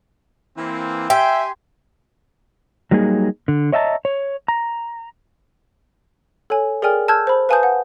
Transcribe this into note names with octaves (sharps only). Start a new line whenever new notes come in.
E3 A#3 C4
G4 E5 G5 G#5 C6
F#3 G3 A#3 D#4 G#4
D3
C#5 D#5 E5 G5 A5 A#5
C#5
A#5
A4 C#5 G#5
G#4 A#4 D5 G5 G#5 F6
A5 E6 F6 G6 G#6
C5 B5
B4 F5 G#5 A5 D#6 G6
F#5